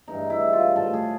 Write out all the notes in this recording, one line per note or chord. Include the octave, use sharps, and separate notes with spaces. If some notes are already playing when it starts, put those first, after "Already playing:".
G2 E3 G#3 D#4
E4
F4
A2 F3 A3 A4
G#4